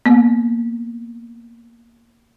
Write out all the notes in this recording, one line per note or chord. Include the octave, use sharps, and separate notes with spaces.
A#3 B3